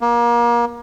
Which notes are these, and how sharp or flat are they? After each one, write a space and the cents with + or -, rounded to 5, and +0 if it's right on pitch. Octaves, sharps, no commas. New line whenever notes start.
A#3 +30